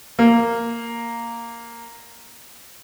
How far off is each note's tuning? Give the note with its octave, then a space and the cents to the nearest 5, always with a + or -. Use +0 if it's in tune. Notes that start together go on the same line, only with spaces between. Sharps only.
A#3 -5